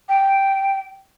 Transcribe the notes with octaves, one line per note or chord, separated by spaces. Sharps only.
G5